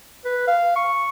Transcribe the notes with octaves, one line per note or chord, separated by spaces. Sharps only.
B4
F5
C#6